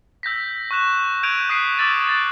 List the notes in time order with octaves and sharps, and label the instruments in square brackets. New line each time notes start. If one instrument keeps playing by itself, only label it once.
[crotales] E6 G6 A#6 B6
C#6 F#6 E7
E6 G6 G#6 D7 D#7 F7
D#6 F#6 B6 C7 D7 D#7
D6 E6 A6 D#7
F#6 A6 D7